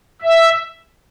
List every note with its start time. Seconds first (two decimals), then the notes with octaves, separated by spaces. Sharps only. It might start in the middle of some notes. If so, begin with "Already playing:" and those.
0.22 E5